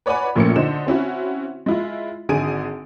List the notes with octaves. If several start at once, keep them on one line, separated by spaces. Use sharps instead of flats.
B4 C#5 D5 F#5 G#5 B5
A#1 A#2 A3 A#3 C#4 C#7
D3 D#4 C5 E7
C4 C#4 E4 F#4
G#3 E4 F4
G#1 D3 G#4 G#5 D7 D#7